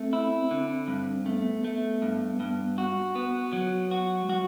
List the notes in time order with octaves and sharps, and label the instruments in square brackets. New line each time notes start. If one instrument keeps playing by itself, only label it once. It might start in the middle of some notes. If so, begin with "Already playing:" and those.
Already playing: [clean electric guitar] A3 [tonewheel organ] C4
[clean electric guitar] E4
D3
G2
[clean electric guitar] A3 [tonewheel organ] B3
[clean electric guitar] A3
G2
G2
F#4
B3
F#3
F#4
[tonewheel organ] G3
[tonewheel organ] F#3 [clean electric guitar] F#4